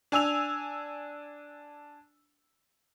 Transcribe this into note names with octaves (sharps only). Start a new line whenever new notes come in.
D4 G#5 E6 F7